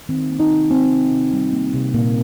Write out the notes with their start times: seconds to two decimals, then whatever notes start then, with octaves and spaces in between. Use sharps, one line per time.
0.09 D#3 C4
0.30 A#3
0.40 D#4
0.50 C3
0.70 A#3 C4
0.91 C3
1.11 C3
1.33 G3
1.53 A#3
1.74 C3
1.94 A#2 A#3